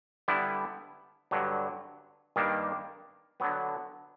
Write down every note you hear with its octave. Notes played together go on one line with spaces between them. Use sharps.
D3 G3 B3 E4
G2 D3 F#3
G2 D#3 G3 A#3 D4
D3 F#3 B3